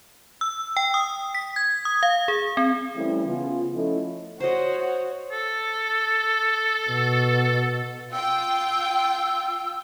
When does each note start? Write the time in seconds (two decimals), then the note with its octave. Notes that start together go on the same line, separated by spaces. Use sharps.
0.41 E6
0.77 G5
0.94 D#6
1.35 B6
1.56 G#6
1.85 D#6
2.03 F5
2.28 G#4
2.57 C4
2.96 E3 G3 A3 C4 C#4 E4
3.26 C#3 B3 F4
3.74 F3 A3 C#4 E4 A4 D#5
4.40 F#4 C5 C#5 D#5
5.32 A4
6.89 B2
8.12 F4 G5 E6